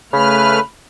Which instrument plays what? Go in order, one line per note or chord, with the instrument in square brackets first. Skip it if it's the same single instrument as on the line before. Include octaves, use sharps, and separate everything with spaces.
[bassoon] C#3 [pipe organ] A3 B4 F6 [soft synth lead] B5